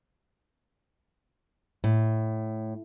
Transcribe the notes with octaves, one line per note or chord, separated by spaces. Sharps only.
A2